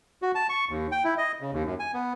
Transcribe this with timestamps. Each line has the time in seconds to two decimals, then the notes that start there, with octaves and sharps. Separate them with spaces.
0.22 F#4
0.35 A5
0.49 C#6
0.69 D#2
0.92 G5
1.04 E4
1.18 D#5
1.41 C#3
1.53 D#2
1.66 F#2
1.79 G#5
1.94 B3